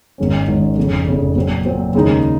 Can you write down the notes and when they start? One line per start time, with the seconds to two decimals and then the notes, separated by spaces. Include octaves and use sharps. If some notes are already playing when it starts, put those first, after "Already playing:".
0.18 G#1 G#2 D#3 G#3 C#4
0.48 G#1 G#2 D#3 G#3 C#4
0.77 F1 F2 C#3
1.07 F1 F2 C#3
1.36 A#2 F#3 C4
1.65 A#2 F#3 C4
1.94 D#2 C#3 G#3 D#4